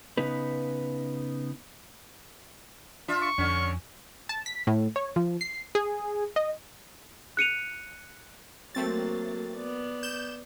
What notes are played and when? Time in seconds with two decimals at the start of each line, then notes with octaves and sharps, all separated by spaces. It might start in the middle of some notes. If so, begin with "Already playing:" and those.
0.17 C#3 B3 D#4 B4
3.08 D4 F4 E5
3.22 C#6
3.38 F2 D3 C#4
4.29 A5
4.46 B6
4.67 A2
4.96 C#5
5.16 F3
5.41 C7
5.75 G#4
6.36 D#5
7.37 F#6 C#7 D#7 F7
8.75 F#3 A3 A#3 C4 A6
9.56 B3 D5
10.03 G6 E7